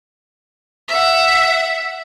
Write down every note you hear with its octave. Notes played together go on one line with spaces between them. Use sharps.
E5 F#5